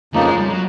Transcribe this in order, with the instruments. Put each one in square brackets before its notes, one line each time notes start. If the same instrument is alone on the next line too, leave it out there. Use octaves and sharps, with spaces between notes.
[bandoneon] F2 C#3 F3 A#3 D#4 [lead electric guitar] A3
[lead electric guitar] G#3
G3
F#3